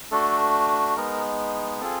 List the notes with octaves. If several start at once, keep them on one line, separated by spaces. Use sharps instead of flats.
A3 D4 F#4 A4
G#3 B3 D#4 A#4
C4 F4 G#4 A4